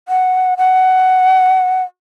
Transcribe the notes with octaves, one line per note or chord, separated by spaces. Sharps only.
F#5
F#5